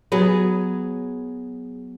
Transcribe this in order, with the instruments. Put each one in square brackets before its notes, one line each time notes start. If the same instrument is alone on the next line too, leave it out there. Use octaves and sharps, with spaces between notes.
[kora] F#3 B3 G#4